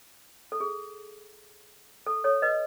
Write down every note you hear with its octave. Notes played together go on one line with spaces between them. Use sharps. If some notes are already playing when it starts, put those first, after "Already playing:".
A4
G#4
A4
A4 C#5
B4 D#5